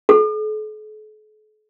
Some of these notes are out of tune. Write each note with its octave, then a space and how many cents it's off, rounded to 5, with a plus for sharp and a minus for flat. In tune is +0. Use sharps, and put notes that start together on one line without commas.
A4 -45